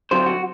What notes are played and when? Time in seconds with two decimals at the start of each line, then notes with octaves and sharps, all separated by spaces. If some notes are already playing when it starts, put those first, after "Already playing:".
0.11 D3 F#3 C4 C5
0.26 F#4